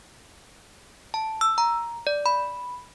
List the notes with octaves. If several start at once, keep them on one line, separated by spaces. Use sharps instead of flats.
A5
E6
A#5
D5
B5